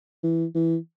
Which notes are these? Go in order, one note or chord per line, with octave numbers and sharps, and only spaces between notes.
E3
E3